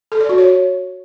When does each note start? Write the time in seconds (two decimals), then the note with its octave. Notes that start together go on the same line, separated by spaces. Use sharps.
0.12 A4
0.20 D5
0.29 F#4
0.38 C#5